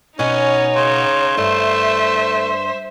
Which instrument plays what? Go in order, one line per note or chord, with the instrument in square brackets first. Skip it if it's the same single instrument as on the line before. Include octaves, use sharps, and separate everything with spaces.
[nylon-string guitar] B2 F#5 G#5 [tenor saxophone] C#4 [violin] D#4 C#5
[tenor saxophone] C#3 [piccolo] C6
[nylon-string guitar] G2 [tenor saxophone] A3 [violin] C5 E5